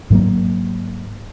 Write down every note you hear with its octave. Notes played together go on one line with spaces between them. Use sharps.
G#2 F#3 A#3